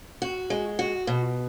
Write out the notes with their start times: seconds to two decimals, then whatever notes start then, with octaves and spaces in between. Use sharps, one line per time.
0.22 F#4
0.50 G#3
0.79 F#4
1.07 B2